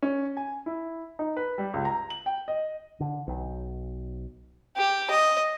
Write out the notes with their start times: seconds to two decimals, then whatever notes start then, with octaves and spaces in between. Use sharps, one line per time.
0.03 C#4
0.37 G#5
0.66 E4
1.19 D#4
1.37 B4
1.58 G3
1.74 C#2
1.85 A#5
2.10 F#7
2.26 G5
2.48 D#5
3.00 D3
3.27 B1
4.77 G4
5.10 D#5